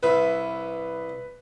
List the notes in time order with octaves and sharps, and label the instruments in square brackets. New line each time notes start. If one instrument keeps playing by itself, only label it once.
[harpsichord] C2 E5 [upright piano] B4